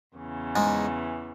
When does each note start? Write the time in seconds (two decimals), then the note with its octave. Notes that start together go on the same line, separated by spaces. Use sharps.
0.15 E2 C#3 E3
0.56 G#2 G#3